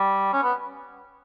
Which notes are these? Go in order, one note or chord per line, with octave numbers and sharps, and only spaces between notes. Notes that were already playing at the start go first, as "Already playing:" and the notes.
Already playing: G3
C#4
B3